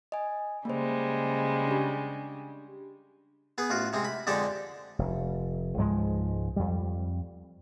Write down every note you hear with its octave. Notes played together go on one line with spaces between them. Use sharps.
D#5 G#5
C#3 G3 G#3 A#3 C5
D4 G4
B3 G#4
A1 F4 F#4
C3 G#3 C4
B5
F2 D3 G#3 G4 A4 D5
F1
C#2 G#2 F3 G#3
F2 G3